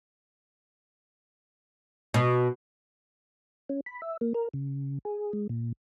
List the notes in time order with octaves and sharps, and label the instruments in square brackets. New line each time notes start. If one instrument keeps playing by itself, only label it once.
[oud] B2
[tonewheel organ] C#4
B5
E5
A#3
A#4
C#3
G#4
G#3
A#2